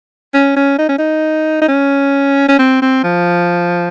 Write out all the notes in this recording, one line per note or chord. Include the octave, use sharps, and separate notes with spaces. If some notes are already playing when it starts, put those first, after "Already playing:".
C#4
C#4
D#4
C#4
D#4
D#4
C#4
C#4
C4
C4
F3